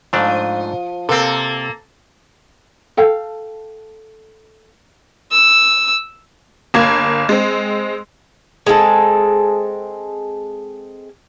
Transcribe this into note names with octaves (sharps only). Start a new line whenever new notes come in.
G#2 F3 A3 D4
C3 A#3 C4 A4
A4 F5 G5
E6
G1 A#3 G#6
G#3 C4
G#3 C4 E4 A4